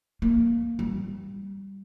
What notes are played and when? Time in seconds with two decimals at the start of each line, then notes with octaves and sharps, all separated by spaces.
0.22 A#3
0.79 G3